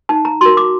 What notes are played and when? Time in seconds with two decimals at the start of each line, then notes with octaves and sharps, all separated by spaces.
0.09 D#4 A5
0.25 A#5
0.41 F#4 A#4 C6
0.57 D6